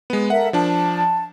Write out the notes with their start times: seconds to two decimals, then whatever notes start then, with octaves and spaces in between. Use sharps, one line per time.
0.10 G#3 B3
0.30 A4 A#4 E5 F#5
0.53 F3 D4 A5